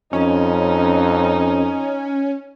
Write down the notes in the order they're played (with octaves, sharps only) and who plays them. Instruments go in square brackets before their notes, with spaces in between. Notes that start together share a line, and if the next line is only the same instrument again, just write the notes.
[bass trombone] F2 [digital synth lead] C#4 [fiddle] D#4